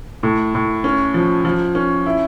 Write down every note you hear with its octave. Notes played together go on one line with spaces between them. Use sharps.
A2
A2
C#4
F3
F3
C#4
E4